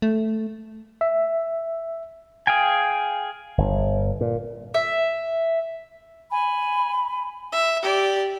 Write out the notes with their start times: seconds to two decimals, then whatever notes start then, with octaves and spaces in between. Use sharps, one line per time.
0.02 A3
1.01 E5
2.47 G#4 F5 G5 G#5
3.58 G1
4.21 A#2
4.74 E5
6.31 G#5 B5
7.52 E5
7.82 G4 D5